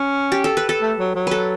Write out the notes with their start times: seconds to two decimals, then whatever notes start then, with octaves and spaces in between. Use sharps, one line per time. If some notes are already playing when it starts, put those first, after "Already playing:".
Already playing: C#4
0.32 G4
0.44 A4
0.57 B4
0.69 A4
0.82 A3
0.99 F#3
1.15 F#3
1.27 A4 B4